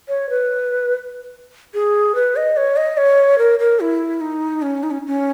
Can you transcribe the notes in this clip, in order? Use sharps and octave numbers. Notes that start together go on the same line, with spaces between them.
C#5
B4
G#4
B4
D#5
C#5
D#5
C#5
A#4
A#4
E4
D#4
C#4
D#4
C#4
C#4